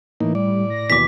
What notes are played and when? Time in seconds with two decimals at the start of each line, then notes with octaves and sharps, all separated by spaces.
0.21 A2 E3 A#3 D#4
0.35 G3 D5
0.70 A#6
0.90 D#2 B2 E3 D6 B6